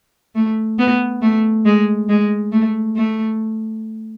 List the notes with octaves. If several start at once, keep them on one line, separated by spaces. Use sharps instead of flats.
A3
B3
A3
G#3
G#3
A3
A3